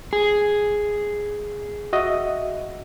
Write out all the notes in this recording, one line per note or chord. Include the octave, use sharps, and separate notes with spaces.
G#4
F#4 D#5 E5